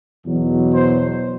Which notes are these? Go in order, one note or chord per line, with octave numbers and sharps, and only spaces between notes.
E2 B2 F#3
C5